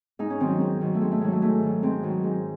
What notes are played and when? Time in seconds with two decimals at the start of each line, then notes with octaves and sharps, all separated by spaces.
0.19 G#2 D#4
0.30 C#4
0.40 D#3 F#3 C4
0.60 G#2 C4
0.81 D#3 F#3
0.95 A3
1.01 G#2 C4
1.11 A3
1.21 D#3 F#3 G#3
1.32 A3
1.42 G#2 A3
1.63 D#3 F#3
1.83 G#2 C4
2.03 D#3 F#3
2.24 G#2